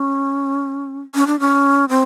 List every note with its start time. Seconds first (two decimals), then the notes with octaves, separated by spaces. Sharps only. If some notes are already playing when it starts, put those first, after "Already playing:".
Already playing: C#4
1.15 C#4
1.27 D4
1.40 C#4
1.89 C4